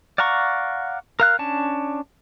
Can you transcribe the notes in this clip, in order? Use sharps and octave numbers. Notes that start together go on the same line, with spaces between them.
D5 F5 F#5 A#5 C#6
A#4 F5 F#6
C#4 D4 A5